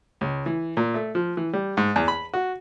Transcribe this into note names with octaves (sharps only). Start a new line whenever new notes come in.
C#2
E3
A#2
A3
F3
E3
G3
G#2
E2
B5
F#4